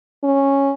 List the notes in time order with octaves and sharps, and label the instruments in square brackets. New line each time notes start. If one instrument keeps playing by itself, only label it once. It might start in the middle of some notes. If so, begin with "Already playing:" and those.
[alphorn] C#4